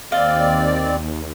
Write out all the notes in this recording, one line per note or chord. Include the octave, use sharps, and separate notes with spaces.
D#2 C4 D5 D#5 F5